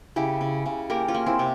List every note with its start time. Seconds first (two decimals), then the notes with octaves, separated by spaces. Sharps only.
0.16 C#3 E4 G4
0.41 C#3
0.66 C#3
0.90 A#3 G4 A#4
1.08 C#4 F4
1.14 A#3
1.26 C4 E4
1.39 C3